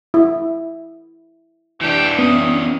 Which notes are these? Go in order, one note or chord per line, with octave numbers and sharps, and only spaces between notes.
E4
E3 D4 G4
B3 C#4 D#6